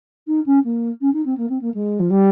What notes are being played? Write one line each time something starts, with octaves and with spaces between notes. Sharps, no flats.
D#4
C#4
A#3
C#4
D#4
C4
A#3
C4
A#3
G#3
F3
G3